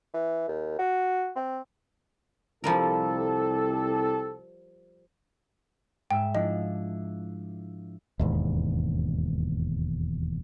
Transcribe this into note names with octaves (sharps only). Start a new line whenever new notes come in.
E3
D#2
F#4
C4
C2 F3 G3 G4 A4 A#4
G#2 E5 G5
F3 D4 E4 D#5
E1 D#2 G#2